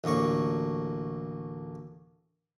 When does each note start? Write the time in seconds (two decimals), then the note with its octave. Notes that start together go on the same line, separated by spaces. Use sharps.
0.04 A1 D2 A#3 C#5 C#6